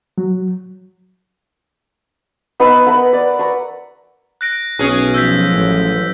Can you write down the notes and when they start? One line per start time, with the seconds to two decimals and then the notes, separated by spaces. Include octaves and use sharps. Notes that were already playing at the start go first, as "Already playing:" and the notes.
0.18 F#3
2.60 B3 D#4 B4 E6
2.87 A#4 B4 E5 F#5
3.13 D5
3.39 A#5 C#6
4.41 F#6 A#6 D7
4.79 B1 C#4 G#4
5.14 F3 F#3 E6 G6 B6
5.51 A1